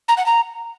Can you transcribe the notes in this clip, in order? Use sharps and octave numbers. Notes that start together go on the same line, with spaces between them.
A#5
F#5
A#5